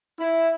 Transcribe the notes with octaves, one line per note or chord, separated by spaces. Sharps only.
E4